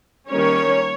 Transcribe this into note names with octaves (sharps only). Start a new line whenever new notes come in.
D#3 G3 A#3 C#4 C#5